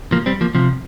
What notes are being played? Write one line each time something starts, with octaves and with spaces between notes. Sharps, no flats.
F3 A#3
G3 C4
F3 A#3
C3 F3